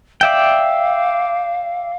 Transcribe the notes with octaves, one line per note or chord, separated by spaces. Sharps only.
D5 E5 F5 G5